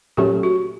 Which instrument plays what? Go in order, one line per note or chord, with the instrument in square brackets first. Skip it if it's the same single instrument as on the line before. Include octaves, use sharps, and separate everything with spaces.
[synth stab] A#2 F#3 A3 C#4 [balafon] G4
[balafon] F#4